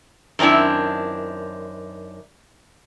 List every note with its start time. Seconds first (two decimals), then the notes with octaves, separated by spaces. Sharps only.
0.39 F#2 D#3 C4 D4 E4